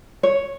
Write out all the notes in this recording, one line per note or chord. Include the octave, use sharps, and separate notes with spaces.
C#5